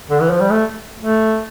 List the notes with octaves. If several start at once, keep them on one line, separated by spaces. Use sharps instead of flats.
D3
E3
F3
G3
A3
A3